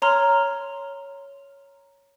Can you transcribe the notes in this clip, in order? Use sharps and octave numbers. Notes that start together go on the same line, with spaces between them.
C#5 A#5 C6 F6